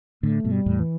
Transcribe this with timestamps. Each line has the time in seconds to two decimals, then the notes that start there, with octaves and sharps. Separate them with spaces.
0.23 A2 D3 A3
0.44 G2 B2
0.52 G3
0.66 E2 A2
0.80 E3